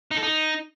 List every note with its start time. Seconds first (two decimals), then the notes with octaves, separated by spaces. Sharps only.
0.11 D#4
0.17 A4
0.23 D#4